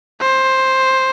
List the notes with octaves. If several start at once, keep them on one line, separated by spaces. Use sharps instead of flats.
C5